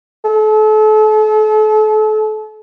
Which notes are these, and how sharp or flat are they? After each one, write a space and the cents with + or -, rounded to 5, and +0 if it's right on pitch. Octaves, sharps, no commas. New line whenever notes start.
A4 -35